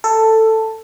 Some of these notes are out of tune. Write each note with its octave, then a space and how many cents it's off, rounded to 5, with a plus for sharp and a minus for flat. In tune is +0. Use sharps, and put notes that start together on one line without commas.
A4 +10